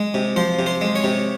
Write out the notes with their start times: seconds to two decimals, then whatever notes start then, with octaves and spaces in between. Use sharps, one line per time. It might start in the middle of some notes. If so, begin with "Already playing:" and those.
Already playing: G#3
0.14 C3
0.36 F3 C5
0.59 C3
0.66 C5
0.81 G#3
0.96 C#5
1.04 C3